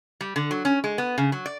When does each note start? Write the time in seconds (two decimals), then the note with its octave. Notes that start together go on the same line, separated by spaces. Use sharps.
0.21 G3
0.36 D3
0.51 F#3
0.65 C#4
0.84 G#3
0.98 B3
1.18 C#3
1.32 F#3
1.46 D5